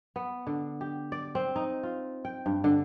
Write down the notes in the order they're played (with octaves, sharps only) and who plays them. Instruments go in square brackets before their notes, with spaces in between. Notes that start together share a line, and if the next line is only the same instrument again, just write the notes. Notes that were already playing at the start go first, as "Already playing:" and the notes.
[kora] B3
D3
G4
D5
C4
D#4
F4
G5
G2
D3